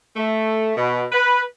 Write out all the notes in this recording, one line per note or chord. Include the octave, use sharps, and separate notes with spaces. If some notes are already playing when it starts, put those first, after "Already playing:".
A3
B2
B4